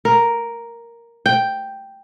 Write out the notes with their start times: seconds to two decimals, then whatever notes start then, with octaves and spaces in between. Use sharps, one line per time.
0.05 A#4
1.26 G5